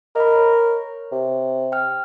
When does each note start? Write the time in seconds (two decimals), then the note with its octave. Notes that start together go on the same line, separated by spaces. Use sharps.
0.16 A#4 D#5 B5
0.36 C#5
1.12 C3
1.72 G5 F6